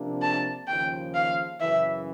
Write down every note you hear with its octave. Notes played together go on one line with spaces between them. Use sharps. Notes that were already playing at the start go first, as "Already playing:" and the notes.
Already playing: C3 F3 A#3 D4
A5
D#2 C#3 F3 G5
F5
F#2 C#3 E3 E5